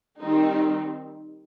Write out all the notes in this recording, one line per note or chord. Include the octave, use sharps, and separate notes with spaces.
D#3 G3 C4 D#4